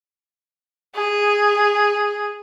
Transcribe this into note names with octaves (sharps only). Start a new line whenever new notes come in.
G#4